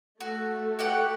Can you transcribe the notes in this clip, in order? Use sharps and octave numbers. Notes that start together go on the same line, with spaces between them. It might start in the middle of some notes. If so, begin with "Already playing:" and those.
A3 F#4
F#4 G4 F#5